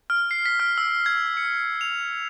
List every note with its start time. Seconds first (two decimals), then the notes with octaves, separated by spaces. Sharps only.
0.10 F6
0.31 C7
0.46 B6
0.60 F6
0.78 E6
1.06 G#6
1.37 C#7
1.81 F7